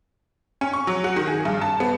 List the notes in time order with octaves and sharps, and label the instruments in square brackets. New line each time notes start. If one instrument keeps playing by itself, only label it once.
[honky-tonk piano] C#4
C#6
F#3
F#4
D#3
G#4
G2
A5
B3